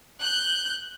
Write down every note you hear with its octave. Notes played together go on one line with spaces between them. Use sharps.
F#6 G6